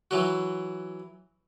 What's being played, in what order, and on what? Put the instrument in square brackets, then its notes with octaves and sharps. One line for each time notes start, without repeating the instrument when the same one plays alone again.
[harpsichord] E3 F#3 F#4